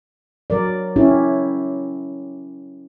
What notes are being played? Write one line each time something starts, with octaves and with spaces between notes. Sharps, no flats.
F#3 A#4 D5
C#4 E4 G4